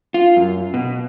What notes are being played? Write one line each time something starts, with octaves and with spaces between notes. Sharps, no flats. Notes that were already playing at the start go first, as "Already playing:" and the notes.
F4
F#2
B2